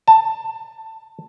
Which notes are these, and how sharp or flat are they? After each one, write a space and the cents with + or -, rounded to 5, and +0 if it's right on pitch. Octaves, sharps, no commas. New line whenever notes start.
A5 +15